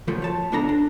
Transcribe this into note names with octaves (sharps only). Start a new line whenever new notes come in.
C#3 F3 F#3 A3 A#3
C#5 A5
C#2 B3 D4 A4 A#5
D4